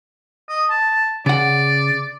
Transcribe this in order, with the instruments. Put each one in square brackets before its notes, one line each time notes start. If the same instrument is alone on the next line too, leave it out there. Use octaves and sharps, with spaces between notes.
[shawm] D#5
A5
[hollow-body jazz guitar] C#3 F#5 [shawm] D5